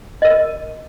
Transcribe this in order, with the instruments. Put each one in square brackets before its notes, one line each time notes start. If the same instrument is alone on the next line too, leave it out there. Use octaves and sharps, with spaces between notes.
[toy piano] A#4 D#5